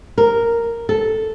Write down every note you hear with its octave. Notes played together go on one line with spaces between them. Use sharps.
A#4
A4